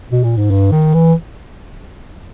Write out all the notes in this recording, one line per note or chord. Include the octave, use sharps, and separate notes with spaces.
B2
A#2
G#2
G2
D#3
E3